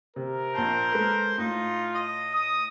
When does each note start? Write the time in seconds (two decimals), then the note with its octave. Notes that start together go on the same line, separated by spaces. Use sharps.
0.16 C3 A#4
0.55 A#1 C5 A5
0.92 G#3 A4 B4
1.38 A2 D#4 F4
1.95 D#5
2.34 D#6